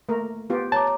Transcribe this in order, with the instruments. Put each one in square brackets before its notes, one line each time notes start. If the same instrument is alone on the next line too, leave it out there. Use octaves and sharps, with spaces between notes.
[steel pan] A3 A#3 A#4
B3 F4 G4
[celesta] C#5 A#5 D6 [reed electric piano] A5